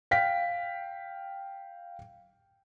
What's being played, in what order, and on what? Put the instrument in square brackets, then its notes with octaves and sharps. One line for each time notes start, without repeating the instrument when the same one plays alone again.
[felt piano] F5 G5 B6